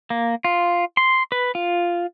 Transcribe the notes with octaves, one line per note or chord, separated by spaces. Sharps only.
A#3
F4
C6
B4
F4